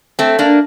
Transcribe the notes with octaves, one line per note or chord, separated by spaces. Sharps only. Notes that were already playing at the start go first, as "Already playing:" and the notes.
A3 C4
A#3 D4